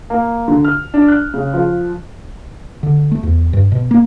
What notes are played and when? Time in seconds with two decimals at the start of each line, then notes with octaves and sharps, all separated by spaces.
0.10 A#3
0.48 D3
0.65 F6
0.94 D4
1.08 F#6
1.34 C#3
1.54 F3
2.83 D3
3.11 A3
3.23 E2
3.53 G2
3.72 B2
3.91 A#3